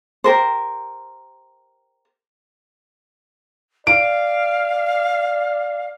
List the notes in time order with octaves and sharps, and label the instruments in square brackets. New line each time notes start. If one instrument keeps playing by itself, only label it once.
[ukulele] G4 A#4 C5
[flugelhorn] D5 [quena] F5 [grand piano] D7